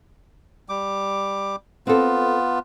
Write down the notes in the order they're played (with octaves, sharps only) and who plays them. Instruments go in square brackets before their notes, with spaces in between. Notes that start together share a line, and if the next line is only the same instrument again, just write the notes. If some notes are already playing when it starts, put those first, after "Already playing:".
[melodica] G3 D6
[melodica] B3 F4 [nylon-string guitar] C4 A4